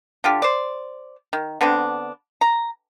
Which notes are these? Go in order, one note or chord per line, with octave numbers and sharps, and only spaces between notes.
D3 F4 G4
C5 D5
D#3
D3 B3 C4 D4
A#5